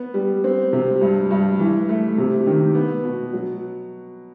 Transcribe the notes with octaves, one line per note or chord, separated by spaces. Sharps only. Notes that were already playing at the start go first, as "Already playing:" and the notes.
Already playing: B3
G3
C4
C3
G2
G2
E3
A3
C3
D#3
B3
B2
F#3